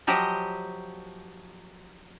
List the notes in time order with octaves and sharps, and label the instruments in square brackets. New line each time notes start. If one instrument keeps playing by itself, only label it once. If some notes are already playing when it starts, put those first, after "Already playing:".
[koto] F3 F#3 G4 D#5